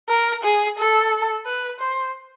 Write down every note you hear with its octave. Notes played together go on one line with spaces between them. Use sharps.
A#4
G#4
A4
B4
C5